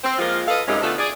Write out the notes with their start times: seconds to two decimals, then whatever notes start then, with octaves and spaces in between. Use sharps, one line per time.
0.04 C4
0.19 F3 G#3 A#3 F4
0.48 A4 B4 D#5 F5
0.68 F#2 C3 G3 G#3 C#4 D#4
0.82 D3 A3 B3 F4 A4
0.99 G#4 D5